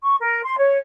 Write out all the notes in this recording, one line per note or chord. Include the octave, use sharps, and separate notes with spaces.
C#6
A#4
C6
C#5